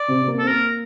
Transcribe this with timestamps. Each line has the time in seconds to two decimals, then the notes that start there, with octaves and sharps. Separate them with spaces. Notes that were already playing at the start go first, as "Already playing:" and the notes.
Already playing: D5
0.08 C3 C4
0.22 C4
0.28 A#3
0.39 A4
0.43 C4
0.48 A#3 A#4